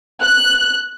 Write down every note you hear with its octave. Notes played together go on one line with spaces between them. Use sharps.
F#6